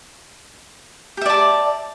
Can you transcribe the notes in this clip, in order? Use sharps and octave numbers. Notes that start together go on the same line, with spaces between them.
G4 D5 E5 A5